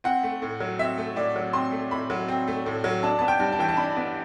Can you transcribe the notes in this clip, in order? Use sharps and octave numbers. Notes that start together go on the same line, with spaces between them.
C4 F#5
A3
A2
F#3
C4 E5
A3
A2 D5
F#3
C4 C6
A3
A2 B5
F#3
C4
A3
A2
F#3
D4 A5
B3 A5
G5
G2
A5
E3 G5
A5
D4 B5
B3